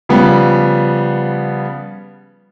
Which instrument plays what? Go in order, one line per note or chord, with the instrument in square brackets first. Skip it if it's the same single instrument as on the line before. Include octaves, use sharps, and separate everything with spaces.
[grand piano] C#3 F3 G3 B3